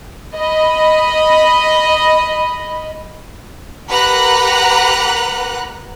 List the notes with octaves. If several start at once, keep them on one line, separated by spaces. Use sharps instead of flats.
D#5 B5
G4 A#4 B4 F#5 A#5 F#6